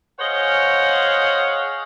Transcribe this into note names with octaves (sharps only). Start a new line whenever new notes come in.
G#4 C5 C#5 D#5 F5 F#5